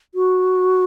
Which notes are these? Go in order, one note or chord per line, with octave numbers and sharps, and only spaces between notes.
F#4